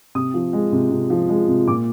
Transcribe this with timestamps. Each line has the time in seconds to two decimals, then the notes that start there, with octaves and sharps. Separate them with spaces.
0.15 C3 D#6
0.34 F3
0.53 G#3
0.72 C3
0.91 C3
1.10 F3
1.29 G#3
1.48 C3
1.67 A#2 D6